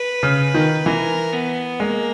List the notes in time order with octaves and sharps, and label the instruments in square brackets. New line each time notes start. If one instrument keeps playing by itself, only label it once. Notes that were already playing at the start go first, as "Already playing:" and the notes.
Already playing: [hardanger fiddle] B4
[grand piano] C#3
D#3
[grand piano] E3 [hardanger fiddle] A#4
[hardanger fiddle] B3
[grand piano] G#3 [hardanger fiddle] A#3